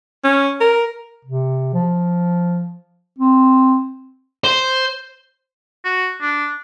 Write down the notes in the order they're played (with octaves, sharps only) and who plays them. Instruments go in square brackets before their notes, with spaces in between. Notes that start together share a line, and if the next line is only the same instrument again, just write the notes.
[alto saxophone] C#4
A#4
[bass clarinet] C3
F3
C4
[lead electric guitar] C5
[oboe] F#4
D4